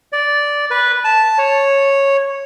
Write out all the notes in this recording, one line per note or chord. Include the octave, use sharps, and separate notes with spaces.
D5
B4
A5
C#5